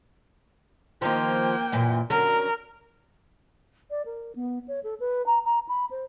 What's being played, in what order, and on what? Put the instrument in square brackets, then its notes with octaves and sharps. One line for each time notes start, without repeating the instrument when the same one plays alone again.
[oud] D#3 F3 [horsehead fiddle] A#3 G5
[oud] F#2 A#2 E3
[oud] D3 F#3 C#4 [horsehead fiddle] A#4
[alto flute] D5
A#4
B3
C#5
A4
B4
A#5
A#5
B5
C5